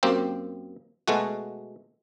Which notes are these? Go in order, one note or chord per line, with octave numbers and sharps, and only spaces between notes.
F#2 A#3 C4 G4
B2 G#3 A3 F#4